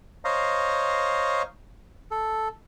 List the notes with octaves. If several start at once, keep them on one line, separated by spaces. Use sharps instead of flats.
C5 C#5 D#5 F5 A#5
A4